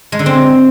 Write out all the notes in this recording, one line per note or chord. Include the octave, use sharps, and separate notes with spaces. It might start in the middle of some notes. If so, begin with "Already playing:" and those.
G#3
D3
C4